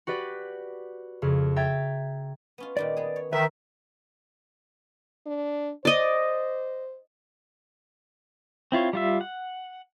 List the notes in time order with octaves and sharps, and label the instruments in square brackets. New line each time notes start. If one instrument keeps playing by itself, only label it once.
[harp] F#4 G4 B4 D5
F2 C#3
E5 G5 A#5 G#6 A6
[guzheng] B3 C#4 F4
[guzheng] A#2 D#3 G3 [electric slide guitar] D5
[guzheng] B3 G#4
C#5
[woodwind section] D#3 E5 [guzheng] E3 [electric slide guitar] B4
[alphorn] D4
[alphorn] C5 [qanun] D5 D#5
[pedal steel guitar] C4 E4 F4 C#5
G3 F4 E5
F#5